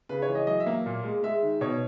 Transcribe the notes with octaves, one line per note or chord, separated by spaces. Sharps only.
C#3 B4
C#5
E3
D#5
F#3 D#5
E5
A#3
A#2
G#3
G#3 E5
D#3
B2 C#5